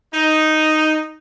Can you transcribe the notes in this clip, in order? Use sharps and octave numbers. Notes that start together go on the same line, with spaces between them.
D#4